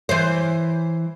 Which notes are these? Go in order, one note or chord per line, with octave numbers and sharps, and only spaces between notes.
E3 C5